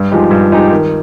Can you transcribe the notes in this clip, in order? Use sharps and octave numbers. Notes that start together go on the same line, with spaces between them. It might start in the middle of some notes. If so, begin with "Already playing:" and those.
Already playing: G2
F3 G#3 D#4 G4
G2
F3 G#3 D#4 G4
D#3